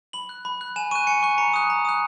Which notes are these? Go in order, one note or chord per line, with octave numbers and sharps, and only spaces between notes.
B5 F#7
F#6
B5
F#6
G#5 E7
C#6 F#6 D#7
G#5 C#7
C#6 F#6
A#5 C#7
D#6 F#6
A#5
D#6 F#6